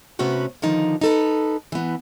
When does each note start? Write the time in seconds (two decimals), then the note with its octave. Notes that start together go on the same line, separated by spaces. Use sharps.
0.19 C3 A3 B3 C#4 F#4 B4
0.62 D3 D#3 F3 D#4
1.01 D#4 A4 B4
1.72 E3 B3